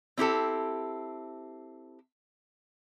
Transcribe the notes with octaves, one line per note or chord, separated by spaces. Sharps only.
C4 E4 G4 A4